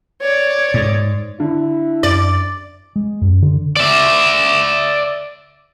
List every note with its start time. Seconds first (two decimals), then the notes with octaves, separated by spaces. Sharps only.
0.22 C#5 D5
0.74 G#2
1.40 D3 E4
2.03 F#2 D5
2.96 G#3
3.21 F#2
3.42 D3
3.76 D5 E5